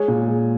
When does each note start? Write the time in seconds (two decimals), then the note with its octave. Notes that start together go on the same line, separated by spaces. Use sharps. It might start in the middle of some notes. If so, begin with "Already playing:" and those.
Already playing: G#3 G#4 C#5
0.08 A#2
0.27 G#3